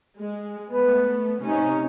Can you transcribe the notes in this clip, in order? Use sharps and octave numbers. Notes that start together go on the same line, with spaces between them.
G#3
A3 B3 B4
C3 C#4 D#4